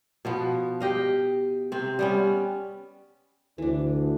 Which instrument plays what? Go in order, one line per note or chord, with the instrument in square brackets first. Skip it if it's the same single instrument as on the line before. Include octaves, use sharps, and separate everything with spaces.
[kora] B2 F3 B3
G4 D#5 F5
C3 C4
G3 B3 C#4
[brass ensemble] D2 [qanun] E3 D4